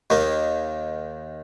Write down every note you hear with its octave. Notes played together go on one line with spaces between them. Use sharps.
D#2 D#3 A#3